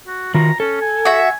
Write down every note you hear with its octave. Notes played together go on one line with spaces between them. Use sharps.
F#4
D#3 F4 F#4 A#5
C#4 A4
G#5
F#4 E5